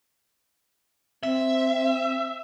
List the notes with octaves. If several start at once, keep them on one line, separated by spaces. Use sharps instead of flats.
C4 E5